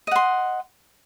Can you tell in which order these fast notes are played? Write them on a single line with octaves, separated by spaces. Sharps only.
D#5 F#5 C6